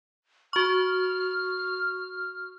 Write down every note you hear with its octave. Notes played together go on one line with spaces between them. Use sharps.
F#4 C#6 F6